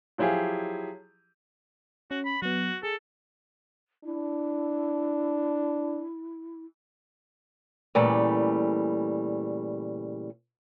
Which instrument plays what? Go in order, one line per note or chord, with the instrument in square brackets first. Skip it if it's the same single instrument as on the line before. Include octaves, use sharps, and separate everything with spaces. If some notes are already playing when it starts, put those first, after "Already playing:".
[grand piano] F3 F#3 E4 G4 G#4 F5
[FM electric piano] C#4 [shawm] F#4
[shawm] B5
[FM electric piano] F#3 B3 [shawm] F#4
[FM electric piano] G#4 [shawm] A4
[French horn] D4 [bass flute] E4
[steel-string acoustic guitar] A#2 C#3 E3 G3 A3